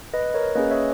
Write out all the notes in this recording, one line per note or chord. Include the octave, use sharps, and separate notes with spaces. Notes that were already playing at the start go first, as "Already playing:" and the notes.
B4 D#5
A#4 C#5
A#3 C#4 G#4 B4 D#5
C#5 E5